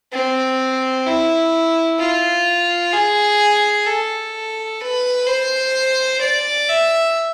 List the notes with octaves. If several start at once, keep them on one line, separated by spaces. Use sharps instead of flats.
C4
E4
F4
G#4
A4
B4
C5
D5
E5